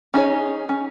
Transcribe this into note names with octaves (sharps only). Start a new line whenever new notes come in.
C#4 D#4 G#4 C#5
C#4